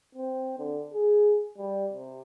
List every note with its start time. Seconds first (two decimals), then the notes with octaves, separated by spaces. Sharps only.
0.15 C4
0.58 D3
0.93 G#4
1.57 G3
1.93 C3